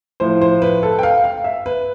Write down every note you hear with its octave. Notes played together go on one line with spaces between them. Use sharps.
A2 F3 C5
C5
B4
A4
G5
F5
F5
E5
B4